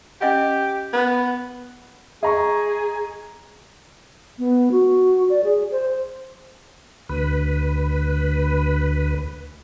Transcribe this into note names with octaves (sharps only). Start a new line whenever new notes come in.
C#4 G4 D#5 F#5
B3
G#4 D#5 A#5 C#6
B3
F#4
D5
G#4
C5
D2 B4